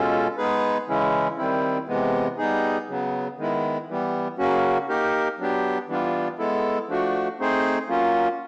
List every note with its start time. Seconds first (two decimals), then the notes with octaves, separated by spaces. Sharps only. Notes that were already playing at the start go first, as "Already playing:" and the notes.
Already playing: B2 G#3 C#4 F4 A4
0.38 G#3 B3 D#4 G#4 B4
0.88 C#3 E3 G#3 C#4 E4
1.38 D#3 G3 C4 E4
1.88 C3 E3 G#3 B3
2.38 G3 B3 D#4 G#4
2.88 C#3 F#3 B3
3.38 D#3 G#3 B3 E4
3.88 E3 G3 B3
4.38 C#3 F#3 A#3 C#4 F#4
4.88 A#3 D#4 G4 A#4
5.38 F#3 B3 D4 G4
5.88 E3 G3 B3 D4 F4
6.38 G#3 B3 E4 A4
6.88 F3 A3 D4 F#4
7.38 A3 C4 D#4 G#4 C5
7.88 F#3 A#3 C#4 F4